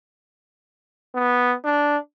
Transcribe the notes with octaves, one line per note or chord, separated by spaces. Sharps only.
B3
D4